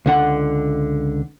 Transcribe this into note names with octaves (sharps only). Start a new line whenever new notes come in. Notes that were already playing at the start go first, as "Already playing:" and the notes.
C#2 D3 F#5